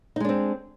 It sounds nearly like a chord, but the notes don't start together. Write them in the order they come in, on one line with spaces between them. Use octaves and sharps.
D#4 G#3 D4 C4